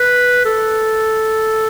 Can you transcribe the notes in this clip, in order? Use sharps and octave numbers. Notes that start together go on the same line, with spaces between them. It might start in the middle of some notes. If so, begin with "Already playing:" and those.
Already playing: B4
A4